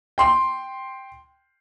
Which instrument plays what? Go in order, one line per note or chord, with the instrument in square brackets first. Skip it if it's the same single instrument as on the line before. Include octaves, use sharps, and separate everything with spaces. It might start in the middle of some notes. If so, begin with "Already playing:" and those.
[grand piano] G5 C6